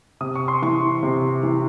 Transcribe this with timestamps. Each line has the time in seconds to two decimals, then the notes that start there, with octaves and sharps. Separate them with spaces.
0.21 C3 D#6
0.35 C#6
0.48 C6
0.62 E3 C#6
1.03 C3
1.43 E3